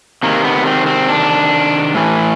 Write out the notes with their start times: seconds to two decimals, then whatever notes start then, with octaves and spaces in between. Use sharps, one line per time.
0.23 C3 D#3 A#3
0.45 B3
0.66 C4
0.87 C4
1.08 D4
1.94 A2 E3